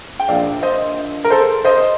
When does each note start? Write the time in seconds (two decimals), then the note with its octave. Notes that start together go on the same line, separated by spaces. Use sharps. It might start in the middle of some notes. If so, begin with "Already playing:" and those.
0.20 G5
0.28 A#1 A#2 F3 A#3 D5 F5
0.63 C5 D#5
1.24 A#4
1.30 A4 C5
1.65 C5 D#5